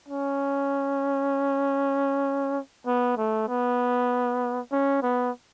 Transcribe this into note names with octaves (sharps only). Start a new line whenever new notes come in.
C#4
B3
A3
B3
C#4
B3